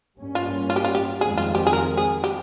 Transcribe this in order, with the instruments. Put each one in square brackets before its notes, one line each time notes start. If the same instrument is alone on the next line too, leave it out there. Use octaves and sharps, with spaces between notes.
[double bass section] G2 G3 A#3 C#4
[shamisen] F4
F4
G4
F4
G4
[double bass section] F2 D#3 G#3 C4 [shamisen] G#4
[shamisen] F4
G4
G#4
A#4
G#4
G4